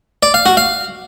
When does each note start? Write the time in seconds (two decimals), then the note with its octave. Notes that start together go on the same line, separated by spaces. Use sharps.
0.23 D5
0.34 F5
0.46 F#4
0.57 F5